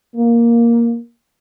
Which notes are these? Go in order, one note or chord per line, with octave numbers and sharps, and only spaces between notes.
A#3